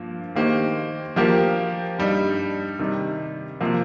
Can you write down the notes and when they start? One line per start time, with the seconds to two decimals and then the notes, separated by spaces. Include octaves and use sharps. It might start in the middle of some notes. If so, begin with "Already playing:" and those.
Already playing: G2 F3 A#3
0.35 D#3 A#3 G4 C5
1.16 F3 A#3 G4 A#4
1.99 G2 G3 D#4
2.79 C3 D#3 G3
3.61 C3 F3 A#3